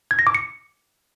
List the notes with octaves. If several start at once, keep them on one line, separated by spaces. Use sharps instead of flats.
G#6
A#6
D6
C#7